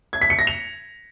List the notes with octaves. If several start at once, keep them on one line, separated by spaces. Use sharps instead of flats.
G#6
B6
C#7
A#6
F7